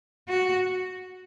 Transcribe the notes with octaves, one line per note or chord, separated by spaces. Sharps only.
F#4